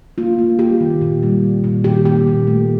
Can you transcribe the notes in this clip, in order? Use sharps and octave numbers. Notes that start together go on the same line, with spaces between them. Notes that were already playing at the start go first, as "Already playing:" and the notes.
A#3 F4
A#3
A#3 G4
D#3
A#2
G3
A#2
A#2
D#3 G4
A#3 G4
A#2
A3